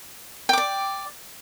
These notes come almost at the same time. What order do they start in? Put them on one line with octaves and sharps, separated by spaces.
G5 D6 D5